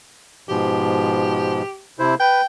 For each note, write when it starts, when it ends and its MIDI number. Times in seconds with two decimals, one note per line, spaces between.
0.49 1.62 44
0.49 1.62 47
0.49 1.62 53
0.49 1.83 67
1.99 2.15 48
1.99 2.15 64
1.99 2.15 72
2.20 2.41 71
2.20 2.45 79